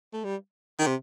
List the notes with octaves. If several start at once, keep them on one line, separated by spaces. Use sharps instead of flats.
A3
G3
D#3
C3